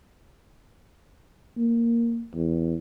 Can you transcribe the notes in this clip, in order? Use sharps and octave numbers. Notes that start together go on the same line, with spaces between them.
A#3
E2